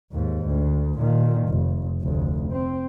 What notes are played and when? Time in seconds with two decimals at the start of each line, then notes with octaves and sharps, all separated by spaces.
0.12 D#2 G#2
0.47 D2
0.98 A#2 D#3
1.49 F1
2.01 F1 D2
2.52 C4